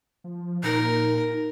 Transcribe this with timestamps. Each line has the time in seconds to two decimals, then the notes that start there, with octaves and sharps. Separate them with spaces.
0.24 F3
0.63 A#2 D#4 A#4